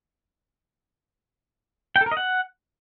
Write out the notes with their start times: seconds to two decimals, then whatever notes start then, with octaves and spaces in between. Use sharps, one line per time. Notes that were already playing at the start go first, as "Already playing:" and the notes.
1.96 G5
2.01 A4
2.06 A#4
2.12 D#5
2.17 F#5